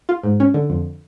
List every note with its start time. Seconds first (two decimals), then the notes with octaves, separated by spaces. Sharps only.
0.09 F4
0.23 G#2
0.40 C#4
0.54 D3
0.70 F2